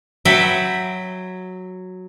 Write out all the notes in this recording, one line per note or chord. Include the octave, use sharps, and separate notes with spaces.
F#3 E5 G5 B5